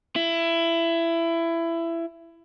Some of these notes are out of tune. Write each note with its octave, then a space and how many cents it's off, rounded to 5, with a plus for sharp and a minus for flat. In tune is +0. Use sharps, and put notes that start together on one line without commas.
E4 +20